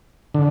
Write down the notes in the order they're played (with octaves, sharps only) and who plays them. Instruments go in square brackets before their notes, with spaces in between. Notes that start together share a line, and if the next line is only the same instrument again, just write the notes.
[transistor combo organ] D3